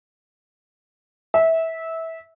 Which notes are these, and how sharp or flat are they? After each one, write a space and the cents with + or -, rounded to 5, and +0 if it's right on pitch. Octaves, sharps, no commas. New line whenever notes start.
E5 -20